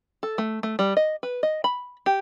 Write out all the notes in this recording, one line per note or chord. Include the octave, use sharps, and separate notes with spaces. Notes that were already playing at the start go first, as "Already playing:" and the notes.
A4
A3
A3
G3
D#5
B4
D#5
B5
G4